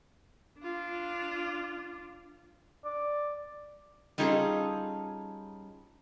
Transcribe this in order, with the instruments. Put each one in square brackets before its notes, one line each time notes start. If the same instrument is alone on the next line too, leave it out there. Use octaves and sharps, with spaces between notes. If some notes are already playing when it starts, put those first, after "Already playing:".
[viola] D4 F4
[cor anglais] D5
[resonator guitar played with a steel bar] G3 C#4 D#4 F4 G#4 A4